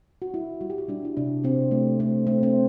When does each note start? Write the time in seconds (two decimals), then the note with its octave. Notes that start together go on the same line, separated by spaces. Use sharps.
0.22 F#4
0.33 G3 E4
0.61 G3 F#4
0.70 G4
0.78 F#4
0.88 G3 D4
1.05 E4
1.17 C3 D4
1.44 C3 C4
1.71 A3
2.00 A3 C4
2.27 A3 C4
2.43 C4